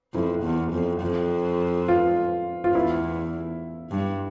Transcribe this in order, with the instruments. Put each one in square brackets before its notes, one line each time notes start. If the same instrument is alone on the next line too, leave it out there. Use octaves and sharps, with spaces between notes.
[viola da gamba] F2 [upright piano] E4
[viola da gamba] E2
F2
F2
[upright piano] F4
F4
[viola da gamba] E2 [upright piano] E4
[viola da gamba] G2